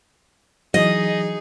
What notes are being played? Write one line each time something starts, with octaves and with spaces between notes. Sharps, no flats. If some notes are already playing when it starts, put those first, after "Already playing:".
E3 F#3 D#4 G#4 D#5